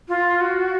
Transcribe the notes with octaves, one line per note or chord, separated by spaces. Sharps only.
F4
F#4